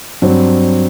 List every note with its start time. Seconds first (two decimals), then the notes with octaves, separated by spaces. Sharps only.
0.22 G2 F#3 C4